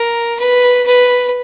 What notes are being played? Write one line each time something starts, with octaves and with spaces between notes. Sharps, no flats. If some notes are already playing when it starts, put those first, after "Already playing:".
Already playing: A#4
B4
B4